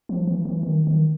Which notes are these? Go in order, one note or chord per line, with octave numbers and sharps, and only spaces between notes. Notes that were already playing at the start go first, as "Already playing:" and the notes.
F3
E3
E3
D#3
D#3